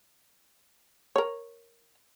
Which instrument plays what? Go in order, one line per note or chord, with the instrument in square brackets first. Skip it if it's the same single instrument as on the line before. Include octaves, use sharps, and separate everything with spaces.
[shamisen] A#4 C#5